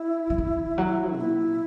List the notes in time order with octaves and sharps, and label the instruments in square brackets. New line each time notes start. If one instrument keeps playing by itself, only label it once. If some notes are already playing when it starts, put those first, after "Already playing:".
Already playing: [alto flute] E4
[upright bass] E3
D#3
F#3
[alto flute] F#4
[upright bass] A#2 [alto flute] E4